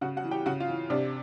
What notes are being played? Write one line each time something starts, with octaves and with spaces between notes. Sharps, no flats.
C#3 F#4 F#5
F#4 F#5
E3
G4 G5
C#3 F#4 F#5
F4 F5
E3
C3 D4 D5